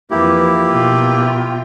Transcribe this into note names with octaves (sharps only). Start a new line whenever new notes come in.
F2 E3 F3 A#3 E4 G4
B2 F4 G5